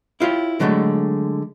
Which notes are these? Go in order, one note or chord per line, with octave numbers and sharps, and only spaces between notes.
E4 F4 G4 C#5
D3 F#3 G#3 A3